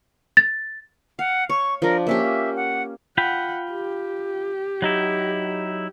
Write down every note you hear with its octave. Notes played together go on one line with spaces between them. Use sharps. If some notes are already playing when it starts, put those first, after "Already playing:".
A6
F5 F#5
C#5 C#6
F3 D4 A#4
A#3 C#4 G4 E5
F#5
F4 F#5 G5 B5
G4
F#3 D#4 E4